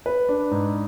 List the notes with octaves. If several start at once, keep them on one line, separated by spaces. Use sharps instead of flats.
B4
D4
G#2